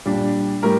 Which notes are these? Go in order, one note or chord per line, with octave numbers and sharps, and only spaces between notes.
A#2 G3 D4
A2 G3 A#4